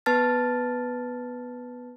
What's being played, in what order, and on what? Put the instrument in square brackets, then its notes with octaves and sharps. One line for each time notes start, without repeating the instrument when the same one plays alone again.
[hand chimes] B3 B4 A5 F6 A6